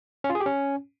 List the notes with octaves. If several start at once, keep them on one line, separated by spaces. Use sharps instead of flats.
C#4
F4
G#4
G4
C#4